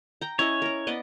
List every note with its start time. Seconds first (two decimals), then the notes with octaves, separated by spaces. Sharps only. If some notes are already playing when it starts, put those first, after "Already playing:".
0.21 G5 A#5
0.39 C#4 E4 C#5 D#5
0.62 A#4 A#5
0.87 B3 D5 D#5